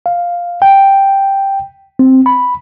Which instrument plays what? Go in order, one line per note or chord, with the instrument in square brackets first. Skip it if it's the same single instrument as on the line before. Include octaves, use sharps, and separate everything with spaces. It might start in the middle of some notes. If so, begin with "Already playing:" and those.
[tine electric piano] F5
G5
C4
B5